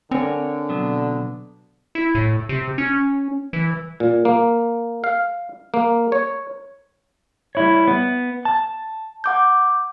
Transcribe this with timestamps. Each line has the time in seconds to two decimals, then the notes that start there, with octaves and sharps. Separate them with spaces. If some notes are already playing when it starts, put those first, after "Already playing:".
0.11 D3 C4 A#4 C#5 G#5
0.69 B2 F#3 B3
1.95 E4
2.15 A2
2.49 C3
2.78 C#4
3.53 E3
4.00 A#2
4.25 A#3
5.04 F5
5.74 A#3
6.12 C#5
7.55 G3 E4 C#5
7.88 B3
8.45 A5
9.24 F#5 D6 G6